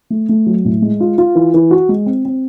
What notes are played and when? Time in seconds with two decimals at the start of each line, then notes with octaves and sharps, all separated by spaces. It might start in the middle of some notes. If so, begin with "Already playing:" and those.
0.10 A3
0.29 A3
0.46 F#3
0.65 A2
0.82 G#3
1.00 F4
1.18 F4
1.35 E3
1.54 E3
1.71 F#4
1.89 G#3
2.06 C4
2.25 C4